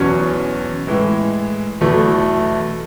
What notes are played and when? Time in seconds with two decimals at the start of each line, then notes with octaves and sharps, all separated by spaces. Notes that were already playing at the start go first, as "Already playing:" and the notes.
Already playing: E2 B2 F#3 C#4
0.87 A2 E3 G#3
1.81 E2 B2 F#3 A3 E4